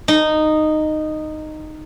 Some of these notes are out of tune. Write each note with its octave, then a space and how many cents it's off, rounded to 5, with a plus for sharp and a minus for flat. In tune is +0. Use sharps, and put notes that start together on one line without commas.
D#4 -10